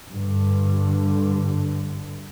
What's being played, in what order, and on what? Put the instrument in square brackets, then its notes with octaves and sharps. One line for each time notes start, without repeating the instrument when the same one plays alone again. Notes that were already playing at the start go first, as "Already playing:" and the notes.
[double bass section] G2 D3